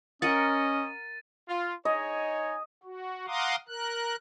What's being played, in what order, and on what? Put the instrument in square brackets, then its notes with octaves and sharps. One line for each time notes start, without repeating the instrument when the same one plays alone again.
[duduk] C#4 [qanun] A#4 F#5 [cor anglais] D#5 [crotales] A6 D#7
[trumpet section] F4
[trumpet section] D#4 C#5 G#5 [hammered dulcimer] D#5
[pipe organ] F#4
F5 F#5 A#5 C6 D6 D#6
A#4 F#6